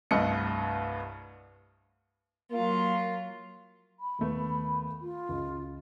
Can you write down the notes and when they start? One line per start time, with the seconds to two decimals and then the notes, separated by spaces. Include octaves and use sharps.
0.11 C2 G2 A3 D#5 C#7
2.51 F#3 A#3 F4
4.00 B5
4.19 D#2 A3 B3
5.01 F4
5.29 C#2